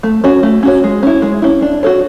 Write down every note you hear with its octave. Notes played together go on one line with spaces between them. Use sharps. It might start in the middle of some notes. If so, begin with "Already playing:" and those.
A3
C#4 F#4 C#5
A3
C#4 F#4 C#5
G#3
C#4 E4
G#3
C#4 E4
D4
F#4 A4 C#5